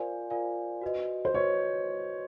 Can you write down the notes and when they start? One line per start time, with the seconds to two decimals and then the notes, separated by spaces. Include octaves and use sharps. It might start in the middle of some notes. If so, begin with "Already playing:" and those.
Already playing: F4 A#4 C5 D5 F5 G#5
0.30 F4 A#4 D5 F5 G#5
0.81 F#4 B4 D#5
1.25 C5
1.34 F#4 B4 C#5 D#5